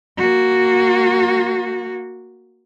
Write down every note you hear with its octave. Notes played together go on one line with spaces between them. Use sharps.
A#3 F#4